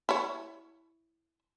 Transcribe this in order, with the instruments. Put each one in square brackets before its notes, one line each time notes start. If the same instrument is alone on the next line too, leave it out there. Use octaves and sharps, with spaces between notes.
[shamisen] E4 C#5